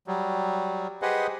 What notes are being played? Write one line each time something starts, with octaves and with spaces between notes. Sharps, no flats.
F#3 G3
G4 G#4 B4 C5 D#5 F#5